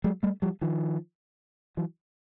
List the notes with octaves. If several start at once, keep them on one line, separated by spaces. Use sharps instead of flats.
F#3 G#3
G3 A3
F3 G3
D#3 F3
E3 F#3